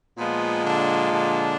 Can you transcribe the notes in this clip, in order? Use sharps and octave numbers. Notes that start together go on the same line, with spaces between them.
A#2 F3 G#3 B3
D3 D4
D3 D4